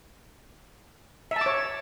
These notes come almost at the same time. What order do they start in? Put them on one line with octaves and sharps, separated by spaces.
E5 A5 D6 C#5